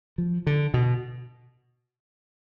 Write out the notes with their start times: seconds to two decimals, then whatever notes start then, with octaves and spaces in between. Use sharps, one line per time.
0.18 F3
0.47 D3
0.74 B2